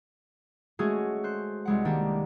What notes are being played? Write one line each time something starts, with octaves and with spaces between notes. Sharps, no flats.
G#3 A3 C#4 F#4 G#4
C5 F#6
C2 G#3 F#5
D#3 A#3 D4 G4